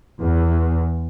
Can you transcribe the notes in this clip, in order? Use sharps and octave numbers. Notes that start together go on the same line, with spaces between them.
E2